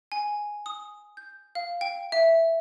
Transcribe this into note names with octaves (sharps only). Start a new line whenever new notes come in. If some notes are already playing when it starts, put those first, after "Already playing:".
G#5
D#6
G6
F5
G5
E5